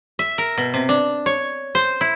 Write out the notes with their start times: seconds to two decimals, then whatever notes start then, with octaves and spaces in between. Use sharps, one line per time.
0.19 E5
0.38 A#4
0.58 B2
0.74 C3
0.89 D4
1.26 C#5
1.75 C5
2.01 E4